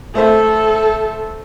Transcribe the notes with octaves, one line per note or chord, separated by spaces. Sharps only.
A3 A4 C5 E5